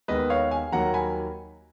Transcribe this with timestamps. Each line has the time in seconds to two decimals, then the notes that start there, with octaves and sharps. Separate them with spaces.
0.08 D#2 D#3 G#3 B3 B4 D#5
0.30 C#5 F5
0.51 F5 G#5
0.72 D#2 D#3 F#3 A#3 F#5 A#5
0.94 G#5 B5